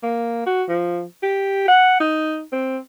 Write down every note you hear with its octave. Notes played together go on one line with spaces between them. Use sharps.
A#3
F#4
F3
G4
F#5
D#4
C4